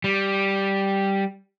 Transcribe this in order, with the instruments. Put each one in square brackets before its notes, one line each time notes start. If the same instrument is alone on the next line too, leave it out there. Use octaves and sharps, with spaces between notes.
[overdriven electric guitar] G3